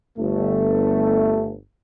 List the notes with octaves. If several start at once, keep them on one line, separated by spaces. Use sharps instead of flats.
G1 A3